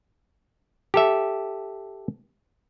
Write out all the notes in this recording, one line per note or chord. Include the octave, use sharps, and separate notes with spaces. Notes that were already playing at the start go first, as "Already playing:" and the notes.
G4 A4 E5